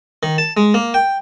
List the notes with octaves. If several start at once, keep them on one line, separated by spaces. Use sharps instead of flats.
D#3
A5
G#3
A#3
G5